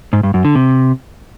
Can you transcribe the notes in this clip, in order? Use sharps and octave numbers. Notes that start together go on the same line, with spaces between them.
G#2
G2
F#2
D3
C3